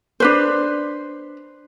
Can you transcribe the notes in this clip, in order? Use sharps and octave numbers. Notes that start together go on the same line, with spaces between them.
D4 B4 C5